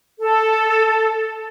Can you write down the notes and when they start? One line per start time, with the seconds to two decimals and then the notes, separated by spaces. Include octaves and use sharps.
0.19 A4